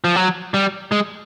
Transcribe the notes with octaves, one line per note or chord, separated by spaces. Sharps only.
F3
F#3
G3
G#3